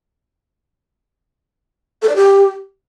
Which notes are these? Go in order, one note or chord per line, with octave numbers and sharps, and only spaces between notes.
A4
D5
G4